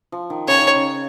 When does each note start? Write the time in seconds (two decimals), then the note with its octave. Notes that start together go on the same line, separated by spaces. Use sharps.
0.12 F3
0.30 D#3
0.48 C#3 C#5
0.61 D#3
0.74 C#3